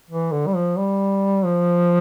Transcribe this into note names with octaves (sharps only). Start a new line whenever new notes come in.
E3
D3
G3
F3
G3
F3